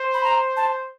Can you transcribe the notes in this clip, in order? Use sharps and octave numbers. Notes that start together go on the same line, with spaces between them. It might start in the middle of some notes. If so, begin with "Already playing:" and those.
Already playing: C5
B5
A#5
A5